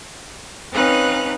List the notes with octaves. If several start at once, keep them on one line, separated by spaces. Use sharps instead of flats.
C4 C#4 D#4 B4 F5 F#6